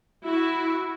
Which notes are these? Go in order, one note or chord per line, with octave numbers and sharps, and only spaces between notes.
E4 F#4